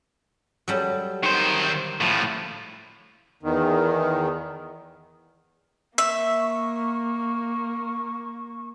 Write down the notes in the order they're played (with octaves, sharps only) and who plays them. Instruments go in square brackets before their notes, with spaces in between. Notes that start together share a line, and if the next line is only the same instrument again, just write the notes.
[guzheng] F#3 G3 A4
[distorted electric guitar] D#3 C5
A2 F3
[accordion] E2 D#3
[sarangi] A#3 [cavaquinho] E5 [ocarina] C#6